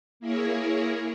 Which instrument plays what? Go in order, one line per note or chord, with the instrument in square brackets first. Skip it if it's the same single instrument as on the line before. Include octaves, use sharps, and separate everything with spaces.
[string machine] A#3 E4 G#4 A#4 C#5